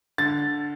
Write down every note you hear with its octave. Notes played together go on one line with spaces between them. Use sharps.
D3 A6